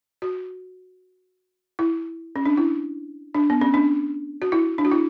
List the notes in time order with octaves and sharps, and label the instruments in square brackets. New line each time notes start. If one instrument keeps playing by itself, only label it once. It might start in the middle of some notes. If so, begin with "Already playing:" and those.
[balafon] F#4
E4
C#4
D4
E4
D4
B3
C#4
D4
F#4
E4
D4
F#4
E4